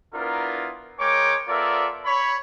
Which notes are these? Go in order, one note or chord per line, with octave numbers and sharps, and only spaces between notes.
B3 D4 E4 F4 A#4
G#3 A#4 C#5 G5 D6
B3 F4 A4 A#4 D5 E5
C#5 B5